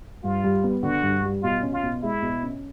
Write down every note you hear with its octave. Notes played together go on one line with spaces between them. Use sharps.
G2 F4
G3
B3
D3 F#4
G2
G3
B2 F4
C#4
F4
B2
G#3 E4
B2
C#4